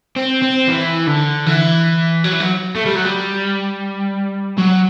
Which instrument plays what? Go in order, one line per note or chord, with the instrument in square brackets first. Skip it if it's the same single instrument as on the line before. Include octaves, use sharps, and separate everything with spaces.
[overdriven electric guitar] C4
C4
E3
D3
E3
F#3
E3
F#3
A3
G3
F#3
G3
F#3